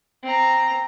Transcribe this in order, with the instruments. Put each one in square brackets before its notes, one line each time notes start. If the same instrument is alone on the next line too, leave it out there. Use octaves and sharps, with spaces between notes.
[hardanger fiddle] C4 A#5